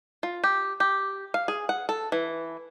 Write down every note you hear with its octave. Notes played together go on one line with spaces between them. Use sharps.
F4
G4
G4
F5
G#4
F#5
A4
E3